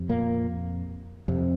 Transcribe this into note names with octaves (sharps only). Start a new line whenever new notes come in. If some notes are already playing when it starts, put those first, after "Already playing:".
Already playing: F2 C3
A#2 A#3
F2 C3